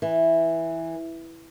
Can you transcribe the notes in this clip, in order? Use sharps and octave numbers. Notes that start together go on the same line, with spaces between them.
E3